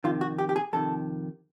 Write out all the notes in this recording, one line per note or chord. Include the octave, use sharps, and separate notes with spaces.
F2 C3 D#3 F4
F#4
G4
G4
G#4
F2 C3 D#3 A4